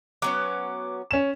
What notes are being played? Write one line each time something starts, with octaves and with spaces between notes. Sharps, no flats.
F#3 B3 C#4 D6
C#4 E7